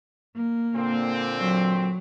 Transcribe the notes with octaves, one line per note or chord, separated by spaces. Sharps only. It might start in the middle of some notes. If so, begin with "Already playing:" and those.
A#3
A#2 D3 C4
F#3